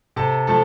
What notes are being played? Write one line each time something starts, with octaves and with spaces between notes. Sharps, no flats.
C3 A4 A5
F3 A3 A4 A5